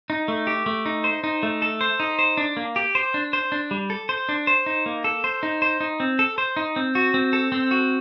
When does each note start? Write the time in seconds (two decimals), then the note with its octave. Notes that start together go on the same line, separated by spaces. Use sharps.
0.10 D#4
0.28 A3
0.47 G4
0.66 A3
0.86 D#4
1.04 C5
1.24 D#4
1.43 A3
1.62 A4
1.81 C5
2.00 D#4
2.19 C5
2.37 D4
2.57 A#3
2.76 G4
2.95 C5
3.14 D4
3.33 C5
3.52 D4
3.71 G3
3.90 A4
4.09 C5
4.29 D4
4.47 C5
4.66 D#4
4.86 A#3
5.04 A4
5.24 C5
5.43 D#4
5.62 C5
5.81 D#4
6.00 C4
6.19 A4
6.38 C5
6.57 D#4
6.76 C4
6.95 F#4
7.14 C4
7.33 A4
7.52 C4
7.71 F#4